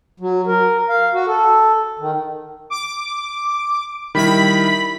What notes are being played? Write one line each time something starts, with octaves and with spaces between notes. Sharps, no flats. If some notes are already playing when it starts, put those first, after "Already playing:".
F#3
A#4
F5
F#4
A4
D#3
D6
D#3 G3 E4 B5 B6